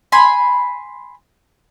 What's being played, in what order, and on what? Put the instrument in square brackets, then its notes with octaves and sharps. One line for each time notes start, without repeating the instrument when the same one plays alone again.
[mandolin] G#5 B5 C6